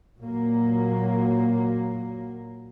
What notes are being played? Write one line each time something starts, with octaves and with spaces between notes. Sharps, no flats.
A#2 F#3 A#3